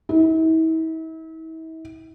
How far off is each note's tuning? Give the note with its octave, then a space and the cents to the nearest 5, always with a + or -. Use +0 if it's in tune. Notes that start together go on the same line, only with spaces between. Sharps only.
E4 -40